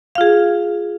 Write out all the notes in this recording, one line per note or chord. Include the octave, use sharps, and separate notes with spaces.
F4 G#4 F5